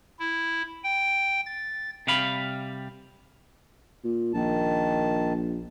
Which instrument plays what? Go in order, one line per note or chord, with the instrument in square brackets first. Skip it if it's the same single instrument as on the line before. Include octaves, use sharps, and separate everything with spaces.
[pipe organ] E4
G5
A6
[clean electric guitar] C3 G3 F5 B5
[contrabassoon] A#2
[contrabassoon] A#1 [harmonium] D#3 A5